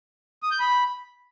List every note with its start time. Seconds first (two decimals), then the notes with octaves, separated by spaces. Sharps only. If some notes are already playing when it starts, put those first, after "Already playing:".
0.43 D#6
0.51 G6
0.60 B5